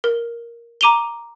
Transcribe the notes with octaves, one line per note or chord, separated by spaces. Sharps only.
A#4
A#5 D6 D#7 F7 G7